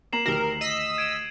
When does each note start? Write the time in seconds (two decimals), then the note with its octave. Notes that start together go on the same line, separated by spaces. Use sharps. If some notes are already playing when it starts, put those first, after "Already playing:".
0.13 A#3 A#5 C7 E7 F#7
0.26 D2 D#3 G4 A#4
0.61 D#5 E6 B6
0.98 G#6 D7 D#7